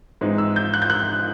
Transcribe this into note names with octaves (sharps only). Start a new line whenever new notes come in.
G#2 E3 G#3 C4 D#4
E6
G6
F#6
G6
F#6